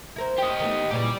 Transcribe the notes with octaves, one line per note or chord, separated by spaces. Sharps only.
E4 A#4 C5
G4 D#5
D#3 A3 B3
A#2 C#3 E3 G4 D5